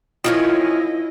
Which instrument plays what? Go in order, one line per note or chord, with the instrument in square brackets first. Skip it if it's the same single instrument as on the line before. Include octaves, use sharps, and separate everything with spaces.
[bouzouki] D#3 F3 C#4 [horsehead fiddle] E4 D#5 [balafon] F4